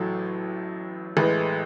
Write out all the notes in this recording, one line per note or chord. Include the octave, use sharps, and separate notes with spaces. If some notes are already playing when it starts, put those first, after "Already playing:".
Already playing: A1 A2 F#3 A4
A1 A2 G#3 B4